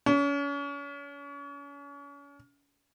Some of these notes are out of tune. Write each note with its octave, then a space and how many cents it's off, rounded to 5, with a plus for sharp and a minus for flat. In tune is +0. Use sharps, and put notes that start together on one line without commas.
C#4 +35